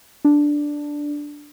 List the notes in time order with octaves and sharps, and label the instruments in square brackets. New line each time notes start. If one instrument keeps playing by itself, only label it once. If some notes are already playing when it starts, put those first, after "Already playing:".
[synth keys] D4